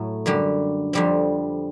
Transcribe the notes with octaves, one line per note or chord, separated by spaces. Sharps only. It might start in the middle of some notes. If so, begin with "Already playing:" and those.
Already playing: A2 F#3 A3
F#2 D3 G3
F2 D3 G3 C4